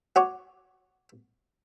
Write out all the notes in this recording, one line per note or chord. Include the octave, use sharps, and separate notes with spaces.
F#4 C#5 D6